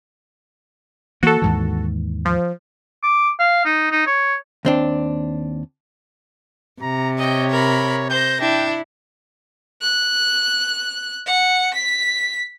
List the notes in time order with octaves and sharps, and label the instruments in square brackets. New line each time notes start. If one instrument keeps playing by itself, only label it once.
[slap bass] E3 A#3 [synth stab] F#4 A4
[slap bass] D#2 G#2 E3
[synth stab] F3
[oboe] D6
F5
D#4
D#4
C#5
[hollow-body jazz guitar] D#2 C4 D4
[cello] C3 [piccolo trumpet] A#5
[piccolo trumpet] C#5 [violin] D#5 G5
[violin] A#4 B5
[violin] C5 A#6 [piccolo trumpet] G6
[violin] D4 [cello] E4 [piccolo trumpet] G5
[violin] F#6
F#5
B6